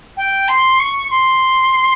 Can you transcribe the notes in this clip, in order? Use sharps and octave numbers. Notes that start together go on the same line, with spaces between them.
G5
C6
C#6
C6